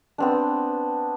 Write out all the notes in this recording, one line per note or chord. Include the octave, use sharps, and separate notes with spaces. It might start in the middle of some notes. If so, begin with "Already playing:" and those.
B3 C4 D4